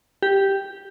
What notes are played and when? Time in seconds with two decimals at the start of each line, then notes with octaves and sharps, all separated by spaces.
0.23 G4